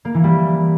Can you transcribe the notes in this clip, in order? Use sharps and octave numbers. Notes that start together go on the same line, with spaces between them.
A#3
E3
G3